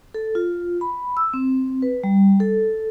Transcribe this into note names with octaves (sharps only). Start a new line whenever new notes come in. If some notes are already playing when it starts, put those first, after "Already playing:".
A4
F4
B5
E6
C4
B4
G3
A4